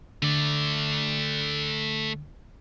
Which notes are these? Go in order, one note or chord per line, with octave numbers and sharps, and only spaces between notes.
D3 A3 D5